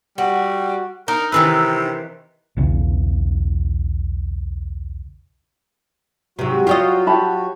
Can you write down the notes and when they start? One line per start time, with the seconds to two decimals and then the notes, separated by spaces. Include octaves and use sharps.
0.18 G3 F#4
1.08 D#4 A#4
1.32 C3 D#3 E3 B4 E6
2.57 B1 E2 C#3
6.39 G#2 C3 F#3 F#4
6.67 F4 G4 C#5 D#5
7.07 G4 A5 B5